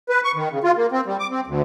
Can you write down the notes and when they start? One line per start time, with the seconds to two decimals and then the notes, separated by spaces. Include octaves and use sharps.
0.09 B4
0.24 C#6
0.35 D#3
0.51 C#3
0.64 F4
0.77 A#3
0.92 C4
1.06 G3
1.19 D6
1.31 C4
1.47 D2